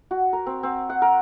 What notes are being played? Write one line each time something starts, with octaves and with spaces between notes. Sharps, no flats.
F#4
A#4
C4
C4
F#5
A#4